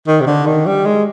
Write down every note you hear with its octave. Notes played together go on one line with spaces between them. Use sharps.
D#3
C3
D3
D#3
G3
G#3